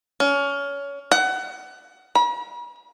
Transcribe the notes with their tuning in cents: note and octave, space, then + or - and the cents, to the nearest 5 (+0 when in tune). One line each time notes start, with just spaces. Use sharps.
C#4 +25
F#5 +25
B5 -45